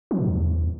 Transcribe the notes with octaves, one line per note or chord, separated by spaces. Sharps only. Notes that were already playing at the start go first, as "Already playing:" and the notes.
F3
A2
E2